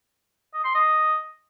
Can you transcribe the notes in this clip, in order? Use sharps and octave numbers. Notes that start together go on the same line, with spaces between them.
D#5
C6
D#5